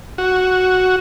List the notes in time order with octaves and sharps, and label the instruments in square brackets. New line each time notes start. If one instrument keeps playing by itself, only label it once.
[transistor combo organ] F#4